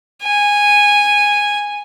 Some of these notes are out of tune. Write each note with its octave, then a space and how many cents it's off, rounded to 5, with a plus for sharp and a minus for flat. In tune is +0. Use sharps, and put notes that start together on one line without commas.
G#5 -10